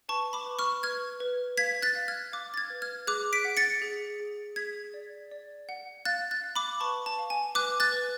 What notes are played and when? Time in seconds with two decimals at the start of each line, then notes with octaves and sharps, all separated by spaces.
0.09 B4 A5 C#6
0.33 B5 D6
0.46 B4
0.59 C#6 F6
0.83 B4 F6 G#6
1.20 B4
1.57 F5 G#6 B6
1.82 F#6 A6
1.95 F5
2.08 F6 G#6
2.32 F5 D6 F#6
2.54 A6
2.57 F6 G#6
2.70 B4
2.82 F6 G#6
3.07 G#4 D6 F#6
3.33 B6 D7
3.45 F#5
3.57 A6 C#7
3.82 G#4
4.20 G#4
4.56 G#4 G#6 B6
4.94 D5
5.31 D5
5.69 F#5
6.05 F5 F#6 A6
6.31 F#6 A6
6.44 F5
6.56 B5 D6
6.80 B4 A5 C#6
7.06 A5
7.19 F5
7.30 G#5
7.55 B4 D6 F#6
7.80 F#6 A6
7.92 B4